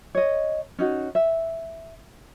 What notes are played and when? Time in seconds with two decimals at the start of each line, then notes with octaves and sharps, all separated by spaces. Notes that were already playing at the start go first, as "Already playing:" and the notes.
0.15 C#5 D#5
0.79 C#4 D#4 F#4
1.15 E5